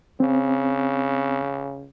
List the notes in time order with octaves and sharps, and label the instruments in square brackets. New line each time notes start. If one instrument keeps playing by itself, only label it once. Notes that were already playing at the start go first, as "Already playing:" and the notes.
[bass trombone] C#3 [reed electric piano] C4